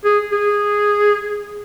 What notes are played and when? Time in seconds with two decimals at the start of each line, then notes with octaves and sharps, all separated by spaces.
0.05 G#4
0.32 G#4